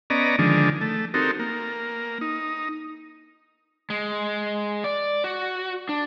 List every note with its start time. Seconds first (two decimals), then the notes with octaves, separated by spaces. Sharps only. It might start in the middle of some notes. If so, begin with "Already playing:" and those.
0.10 B3 C#4 D5 D#5 A#5
0.39 D3 D#3 F3 G#3 D4
0.81 A3
1.14 C4 D#4 F#4 G4 A4 A#4
1.39 A#3
2.21 D#4
3.90 G#3
4.84 D5
5.24 F#4
5.89 D4